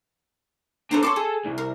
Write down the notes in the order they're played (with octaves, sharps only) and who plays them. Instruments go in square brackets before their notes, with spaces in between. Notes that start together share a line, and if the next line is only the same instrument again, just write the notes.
[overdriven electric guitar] B3 D4 [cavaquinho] A4 C5 A#5
[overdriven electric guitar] A4 A5 [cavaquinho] C#5 C6 D6
[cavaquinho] G#4
[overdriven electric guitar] C2
[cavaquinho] A#4